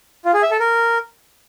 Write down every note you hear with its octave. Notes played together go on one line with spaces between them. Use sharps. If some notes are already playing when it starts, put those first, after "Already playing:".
F4
G#4
E5
A4
A#4